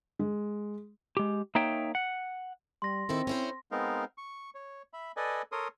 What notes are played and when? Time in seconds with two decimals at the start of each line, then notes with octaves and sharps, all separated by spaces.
0.19 G#3
1.17 G#3 G4
1.55 A#3 D#4 C#5 E5 G5
1.95 F#5
2.82 G3 C6 A#6
3.09 D#3 C4 E4 A4
3.27 C#4 E4 C5
3.72 G#3 B3 C4 D#4 A#4 F5
4.18 C#6
4.55 C#5
4.93 E5 B5
5.17 A4 B4 D5 D#5 G#5
5.52 A4 A#4 C#5 C6 D#6